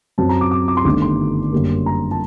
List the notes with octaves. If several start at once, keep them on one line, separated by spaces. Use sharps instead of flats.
F#2 F#3 C4 A5
A#5
D6
D6
D6
C6
G1 G2 D#3 A3 D4 D6
C6
F#2 D3 G3 A#3
A#5
A5